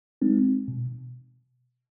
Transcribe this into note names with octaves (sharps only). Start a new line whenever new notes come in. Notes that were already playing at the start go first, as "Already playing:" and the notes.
G#3 C4 D#4
B2